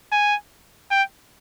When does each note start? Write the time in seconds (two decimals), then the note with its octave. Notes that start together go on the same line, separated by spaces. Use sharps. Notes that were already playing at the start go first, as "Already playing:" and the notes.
0.12 G#5
0.91 G5